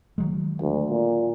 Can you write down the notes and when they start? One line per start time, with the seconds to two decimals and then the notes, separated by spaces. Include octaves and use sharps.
0.18 D#3 F#3 G#3
0.61 D2
0.90 A#2